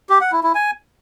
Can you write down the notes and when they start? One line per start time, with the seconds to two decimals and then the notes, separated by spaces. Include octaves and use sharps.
0.09 G4
0.21 F#5
0.32 E4
0.43 E4
0.55 G#5